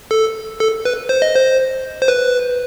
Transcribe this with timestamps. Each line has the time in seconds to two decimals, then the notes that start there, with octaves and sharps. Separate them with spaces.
0.11 A4
0.60 A4
0.85 B4
1.09 C5
1.22 D#5
1.35 C5
2.02 C5
2.08 B4